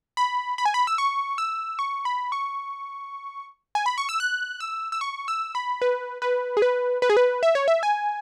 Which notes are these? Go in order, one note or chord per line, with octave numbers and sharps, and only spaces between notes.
B5
B5
G#5
B5
E6
C#6
E6
C#6
B5
C#6
G#5
B5
C#6
E6
F#6
E6
E6
C#6
E6
B5
B4
B4
G#4
B4
B4
G#4
B4
E5
C#5
E5
G#5